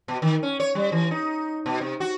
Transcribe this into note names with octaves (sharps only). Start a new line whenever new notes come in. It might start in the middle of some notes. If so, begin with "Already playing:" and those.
B2
D#3
C#4
C#5
G3
E3
D#4
B2
C3
F#4